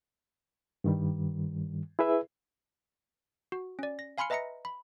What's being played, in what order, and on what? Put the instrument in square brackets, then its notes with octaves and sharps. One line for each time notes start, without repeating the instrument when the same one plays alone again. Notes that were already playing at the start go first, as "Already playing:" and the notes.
[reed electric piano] G2 D#3 G3
E4 G#4 B4 E5
[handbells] F#4
C#4 D5
A#6
F5 G#5 B5 C6 F6 C#7
B4 D#5 E5 A#5 A#6 C#7
B5